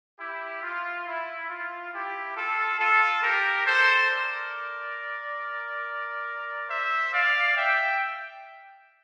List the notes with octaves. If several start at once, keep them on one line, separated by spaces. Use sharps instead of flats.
E4 G4
F4
E4
F4
E4 G4
F4 A4
F4 A4
G4 A#4
A4 C5
A#4 D5
C5 E5
D5 F5
E5 G5